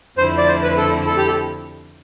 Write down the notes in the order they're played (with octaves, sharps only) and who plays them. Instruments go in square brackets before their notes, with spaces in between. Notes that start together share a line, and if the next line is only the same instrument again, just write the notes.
[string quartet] F2 D3 F3 A3 E4 [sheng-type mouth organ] C5
[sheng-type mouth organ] D5
C5
B4
A4
A4
G4
A4